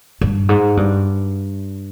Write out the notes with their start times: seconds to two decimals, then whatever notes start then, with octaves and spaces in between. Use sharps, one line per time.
0.21 G2
0.49 G#2
0.77 G2